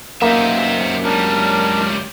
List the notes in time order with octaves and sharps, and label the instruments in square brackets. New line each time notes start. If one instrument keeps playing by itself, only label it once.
[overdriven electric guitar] F#2 D#4 [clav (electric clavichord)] A#3 [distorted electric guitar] C5 E5
[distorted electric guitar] C#2 G3 [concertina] D4 A#4